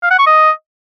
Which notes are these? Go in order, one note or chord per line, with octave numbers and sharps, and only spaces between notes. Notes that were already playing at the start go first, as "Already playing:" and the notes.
F5
F#5
C#6
D#5